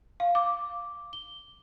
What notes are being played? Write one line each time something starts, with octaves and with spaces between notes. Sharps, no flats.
F5
D6
G7